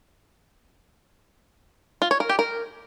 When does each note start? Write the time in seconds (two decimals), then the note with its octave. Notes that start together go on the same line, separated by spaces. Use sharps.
2.02 F4
2.11 C#5
2.20 A#4
2.29 G4
2.39 A#4